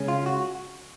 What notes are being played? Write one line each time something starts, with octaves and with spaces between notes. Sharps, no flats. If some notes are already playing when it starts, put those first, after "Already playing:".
Already playing: C#3 G#3 C#4
F4
F#4